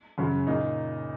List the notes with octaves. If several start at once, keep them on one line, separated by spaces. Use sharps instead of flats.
F#2 C#3 F#3
A#2 A#3 D#4